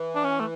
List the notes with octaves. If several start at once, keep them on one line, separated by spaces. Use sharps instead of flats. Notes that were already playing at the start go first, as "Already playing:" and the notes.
Already playing: E3
D4
C#4
A3